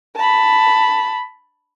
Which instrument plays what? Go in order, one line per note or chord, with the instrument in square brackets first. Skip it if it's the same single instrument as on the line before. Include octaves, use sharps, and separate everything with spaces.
[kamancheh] A5 B5